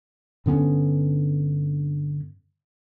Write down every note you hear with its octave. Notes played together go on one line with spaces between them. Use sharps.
G2 D3 B3 C#4